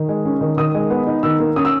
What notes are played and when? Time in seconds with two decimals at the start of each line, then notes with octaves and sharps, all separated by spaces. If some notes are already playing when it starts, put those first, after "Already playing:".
Already playing: D#3
0.09 G#3
0.25 C#4
0.41 D#3
0.57 D#3 D#6
0.75 G#3
0.90 B3
1.07 D#4
1.23 D#3 E6
1.40 A#3
1.56 C#4 D#6
1.65 E6